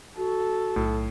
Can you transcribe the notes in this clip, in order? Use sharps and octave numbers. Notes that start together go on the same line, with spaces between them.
F#4 A4
B1 A2